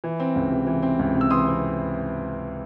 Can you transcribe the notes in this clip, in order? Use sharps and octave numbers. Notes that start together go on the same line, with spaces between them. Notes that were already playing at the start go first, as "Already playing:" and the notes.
E3
C4
C#2
C3
E3
C4
C#2
C3
E6
E3 C6 D#6
C4